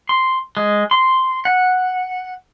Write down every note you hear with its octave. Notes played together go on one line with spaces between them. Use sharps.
C6
G#3
C6
F#5